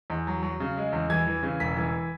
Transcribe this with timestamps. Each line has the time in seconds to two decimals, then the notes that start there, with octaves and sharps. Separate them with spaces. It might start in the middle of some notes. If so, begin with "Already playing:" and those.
0.10 E2
0.27 F#3
0.42 F#3
0.60 C#3
0.77 G#3
0.93 E2
1.10 E3 G#6
1.27 E3
1.43 C#3
1.60 E1 B6
1.77 E3